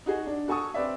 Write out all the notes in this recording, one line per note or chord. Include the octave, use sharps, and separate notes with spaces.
D#4 F#4 G#4
D4
F#4 A4 G#5 A5 C#6 D#6
C4 G4 B4 D5 E5